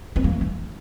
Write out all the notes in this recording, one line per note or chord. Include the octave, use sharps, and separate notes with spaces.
B3
A#3
A3
D#4